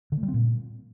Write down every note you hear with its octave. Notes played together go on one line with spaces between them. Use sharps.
D3
A3
G3
C4
A#2